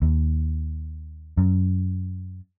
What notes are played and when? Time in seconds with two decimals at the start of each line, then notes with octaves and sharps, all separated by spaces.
0.02 D#2
1.37 F#2